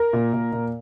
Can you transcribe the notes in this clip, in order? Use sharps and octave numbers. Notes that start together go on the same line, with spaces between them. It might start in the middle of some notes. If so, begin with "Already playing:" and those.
Already playing: A#4
A#2
A#2
A#2